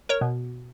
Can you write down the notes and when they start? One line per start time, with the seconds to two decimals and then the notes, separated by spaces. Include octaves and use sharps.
0.09 A#4 C#5
0.21 B2